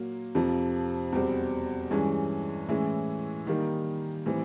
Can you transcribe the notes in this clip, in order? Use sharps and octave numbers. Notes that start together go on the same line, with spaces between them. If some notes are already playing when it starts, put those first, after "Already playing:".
Already playing: A#2 F#3 A#3
F2 C3 F3
E2 B2 G3 C4
G2 E3 G#3 C#4
A2 E3 G#3 C#4 E4
D#3 G3 A#3 D#4
A2 E3 G3 C4